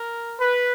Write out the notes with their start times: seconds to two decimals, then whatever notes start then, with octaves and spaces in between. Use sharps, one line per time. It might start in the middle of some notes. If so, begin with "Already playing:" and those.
Already playing: A#4
0.40 B4